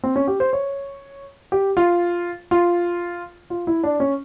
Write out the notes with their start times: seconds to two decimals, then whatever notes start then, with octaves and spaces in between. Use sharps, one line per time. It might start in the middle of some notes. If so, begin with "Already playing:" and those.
0.04 C4
0.16 C#4
0.28 G4
0.40 C5
0.53 C#5
1.52 G4
1.77 F4
2.51 F4
3.50 F4
3.67 E4
3.84 D4
4.00 C#4